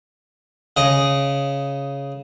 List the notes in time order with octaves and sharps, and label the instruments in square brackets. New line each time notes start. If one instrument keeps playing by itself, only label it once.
[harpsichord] C#3 D#5